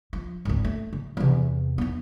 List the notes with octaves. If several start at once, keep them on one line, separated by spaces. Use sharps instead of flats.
F3
G#1 D2
A3
D3
E2 C3
B3 D#4